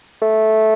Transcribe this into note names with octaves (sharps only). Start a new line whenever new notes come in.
A3